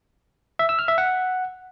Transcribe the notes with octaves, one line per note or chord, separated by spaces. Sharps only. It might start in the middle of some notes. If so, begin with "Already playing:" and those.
E5
E6
F6
E5
F#5